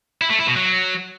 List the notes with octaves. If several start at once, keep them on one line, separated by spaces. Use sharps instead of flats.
E4
A3
E4
B2
F#3